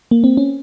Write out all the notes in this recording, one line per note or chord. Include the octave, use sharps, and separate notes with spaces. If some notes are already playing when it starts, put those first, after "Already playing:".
A#3
C4
C#4